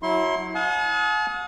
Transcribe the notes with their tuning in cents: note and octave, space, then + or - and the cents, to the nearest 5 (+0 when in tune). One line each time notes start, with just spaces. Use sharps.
F#3 +0 E4 -20 C6 +25
F#5 -40 A5 -45 D#6 +30